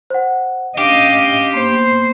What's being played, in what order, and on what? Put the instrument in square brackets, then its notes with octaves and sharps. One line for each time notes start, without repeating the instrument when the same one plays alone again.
[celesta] C5 F#5
[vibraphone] C#4 D4 [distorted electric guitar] G4 [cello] D#5 F5 [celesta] D6 D7
[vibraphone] A#3 B3 [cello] C5